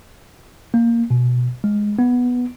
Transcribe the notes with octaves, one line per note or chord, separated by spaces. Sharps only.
A#3
B2
G#3
B3